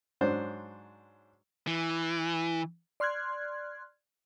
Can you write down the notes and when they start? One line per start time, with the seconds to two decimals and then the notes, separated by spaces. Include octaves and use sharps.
0.21 G#2 F#3 D4 C5
1.67 E3
3.00 D5 C6 F6 F#6 G#6